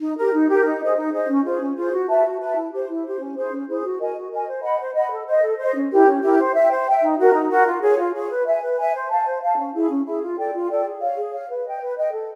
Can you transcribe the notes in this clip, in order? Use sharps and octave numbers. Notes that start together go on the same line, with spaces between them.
D#4
G4 A#4
D#4
G4 A#4
D#4
G#4 C5 D#5
D#4
G#4 C5 D#5
C#4
F4 G#4 C5
C#4
F4 G#4 C5
F#4
B4 E5 A5
F#4
B4 E5 A5
E4
G4 C5
E4
G4 C5
C#4
E4 G#4 C5
C#4
E4 G#4 C5
F#4
A#4 D#5 G#5
F#4
A#4 D#5 G#5
C5
D#5 F#5 B5
C5
D#5 F#5 B5
A4
C5 D#5
A4
C5 D#5
C#4
E4 G4 A#4
C#4
E4 G4 A#4
C5
E5 G5
C5
E5 G5
D#4
F#4 A#4
D#4
F#4 A#4
F4
G#4 C#5
F4
G#4 C#5
B4
E5 G#5
B4
E5 G#5
C5
F5 A5
C5
F5 A5
C#4
E4 G#4
C#4
E4 G#4
F4
A4 D5 G5
F4
A4 D5 G5
G#4
C#5 F5
G#4
C#5 F5
B4
D#5 G5
B4
D#5 G5
A4